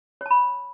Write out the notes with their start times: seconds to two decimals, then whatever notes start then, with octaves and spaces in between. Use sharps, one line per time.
0.21 C#5
0.26 A5
0.31 B5